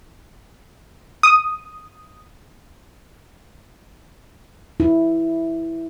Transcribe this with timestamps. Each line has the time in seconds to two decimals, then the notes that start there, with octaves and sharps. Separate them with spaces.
1.23 D#6
4.80 E4